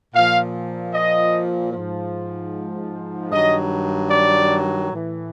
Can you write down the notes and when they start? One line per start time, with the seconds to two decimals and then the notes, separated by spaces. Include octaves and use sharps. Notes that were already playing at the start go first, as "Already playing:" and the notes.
0.14 A#2 F3 F5
0.94 D#5
1.73 G#2 F3
3.32 G2 D#3 F#3 D#5
4.10 D5
4.90 A2 E3